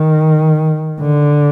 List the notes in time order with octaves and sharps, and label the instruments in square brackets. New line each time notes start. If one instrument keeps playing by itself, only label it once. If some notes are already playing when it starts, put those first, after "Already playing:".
Already playing: [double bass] D#3
D3